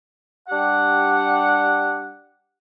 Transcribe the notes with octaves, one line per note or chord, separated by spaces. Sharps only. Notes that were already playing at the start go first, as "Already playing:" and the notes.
G3 D4 G4 F#5